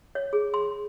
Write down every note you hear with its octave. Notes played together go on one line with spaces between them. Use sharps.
C#5
G#4
C6